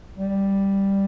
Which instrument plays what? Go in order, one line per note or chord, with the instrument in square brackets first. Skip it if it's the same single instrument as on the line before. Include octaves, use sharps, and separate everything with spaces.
[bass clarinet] G3